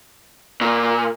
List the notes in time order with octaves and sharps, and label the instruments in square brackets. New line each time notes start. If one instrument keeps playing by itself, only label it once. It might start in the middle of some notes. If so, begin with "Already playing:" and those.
[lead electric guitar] A#2